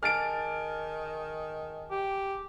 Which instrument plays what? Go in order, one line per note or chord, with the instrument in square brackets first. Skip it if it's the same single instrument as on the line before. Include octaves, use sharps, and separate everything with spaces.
[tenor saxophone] D#3 [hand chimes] G#4 G#5 A5 [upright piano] F6 A6 D7
[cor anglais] G4